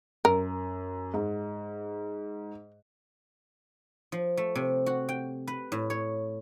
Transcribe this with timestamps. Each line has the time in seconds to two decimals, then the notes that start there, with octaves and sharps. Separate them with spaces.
0.25 F#2 A#4
1.14 G#2
4.12 F3
4.37 A3
4.55 C3
4.86 F#4
5.09 G5
5.47 B4
5.72 A2
5.90 C#5